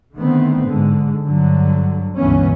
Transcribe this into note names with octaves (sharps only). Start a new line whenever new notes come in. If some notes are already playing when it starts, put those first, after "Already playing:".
D3 D#3 A3 B3 C4
G#2 D3 G#3
G2 D3 F#3
C#2 G2 B2 E3 B3 C#4